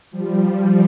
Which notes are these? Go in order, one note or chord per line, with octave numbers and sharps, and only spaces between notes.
F3 G3